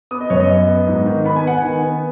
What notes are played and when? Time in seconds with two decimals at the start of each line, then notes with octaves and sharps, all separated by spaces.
0.11 B3 D#6
0.21 D#5
0.30 F#2 C#5
0.40 D#5
0.49 B3
0.68 B3
0.87 G#2
1.06 D#3
1.25 B3 B5
1.36 G#5
1.44 B3 F#5
1.58 G#5
1.63 D#3
1.82 B3